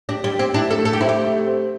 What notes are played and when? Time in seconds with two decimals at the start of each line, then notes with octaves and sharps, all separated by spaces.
0.09 D4 G4
0.24 G3
0.32 G4
0.39 C4
0.54 D4 E4
0.71 A4
0.78 A3
0.85 A4
0.93 G4
1.01 C4 E4
1.09 G4
1.24 A3
1.47 C4